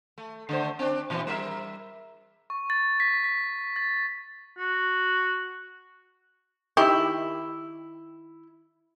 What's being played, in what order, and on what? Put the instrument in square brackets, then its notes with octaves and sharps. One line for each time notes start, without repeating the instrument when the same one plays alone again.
[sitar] A3
D3 A3 C5
C4 D4
A#2 E3 C4
G3 A#4 E5
[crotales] C#6
A6
B6
B6
A6
[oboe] F#4
[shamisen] D#3 G4 [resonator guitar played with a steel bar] E4